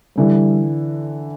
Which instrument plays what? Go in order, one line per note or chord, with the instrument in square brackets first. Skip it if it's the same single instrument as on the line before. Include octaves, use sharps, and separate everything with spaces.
[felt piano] D3 E3 [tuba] G3